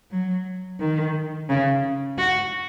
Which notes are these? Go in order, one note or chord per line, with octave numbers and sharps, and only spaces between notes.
F#3
D#3
C#3
F#4